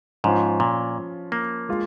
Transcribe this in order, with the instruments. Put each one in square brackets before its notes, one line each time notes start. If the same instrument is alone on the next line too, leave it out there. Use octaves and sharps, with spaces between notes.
[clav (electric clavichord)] G#2 [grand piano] F3 C#4 F4
[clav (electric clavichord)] A#2
A#3
[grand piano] G#3 F4